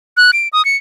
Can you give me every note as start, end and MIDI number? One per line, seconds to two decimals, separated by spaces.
0.17 0.31 90
0.33 0.48 98
0.53 0.64 87
0.65 0.76 97